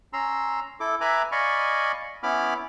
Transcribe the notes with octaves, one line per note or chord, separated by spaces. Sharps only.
C#4 A#5 C6 E6
E4 A4 D6
B4 E5 G#5 A#5 B5 D6
D5 D#5 F5 G#5 B5 C#6
B3 C#4 E4 B5 D6 F6